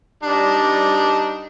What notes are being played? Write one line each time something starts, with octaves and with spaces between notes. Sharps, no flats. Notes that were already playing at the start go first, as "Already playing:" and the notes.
G3 D4 D#4